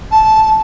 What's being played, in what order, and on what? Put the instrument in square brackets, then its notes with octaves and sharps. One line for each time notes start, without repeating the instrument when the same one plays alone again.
[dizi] A5